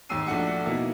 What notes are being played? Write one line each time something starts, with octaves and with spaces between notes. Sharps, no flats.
D#2 G#2 G5 E6 C7 D#7
A#1 A3 D4 F#4 C#7
B2 A#3 B3 D#4 E4